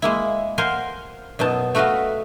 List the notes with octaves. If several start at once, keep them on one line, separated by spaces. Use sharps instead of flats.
G#3 A#3 E4
A#4 C5 F5 F#5 G#5 C6
F#2 B2 D#4 A5
A3 F#4 B4 D#5 F5